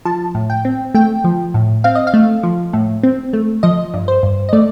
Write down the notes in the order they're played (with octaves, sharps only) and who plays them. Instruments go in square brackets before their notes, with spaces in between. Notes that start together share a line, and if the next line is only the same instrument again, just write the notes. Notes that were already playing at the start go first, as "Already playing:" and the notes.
[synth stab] F3 A5
A2
G5
C4
A3 G5
F3
A2
C4 F5
D#5
F5
A3
F3
A2
C4
A3
F3 D#5
G2
C5
G2
D#5
A3 D5